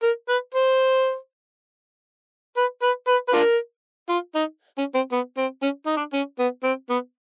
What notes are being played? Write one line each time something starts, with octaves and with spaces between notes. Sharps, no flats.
A#4
B4
C5
B4
B4
B4
B4
D4 F4 A#4
F4
D#4
C#4
C4
B3
C4
C#4
D#4
D4
C#4
B3
C4
B3